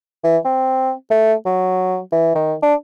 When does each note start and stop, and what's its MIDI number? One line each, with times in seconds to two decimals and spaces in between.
0.24 0.37 52
0.45 0.92 60
1.11 1.34 57
1.46 1.99 54
2.12 2.32 52
2.35 2.54 51
2.62 2.74 62